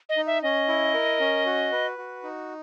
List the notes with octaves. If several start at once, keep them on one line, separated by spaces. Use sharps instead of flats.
D#5
D#4
E5
C#4 D#5
E4
A#4
C#4
F#4
B4
F#4
D#4